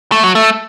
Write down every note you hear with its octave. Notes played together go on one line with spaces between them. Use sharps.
A3
F#3
A3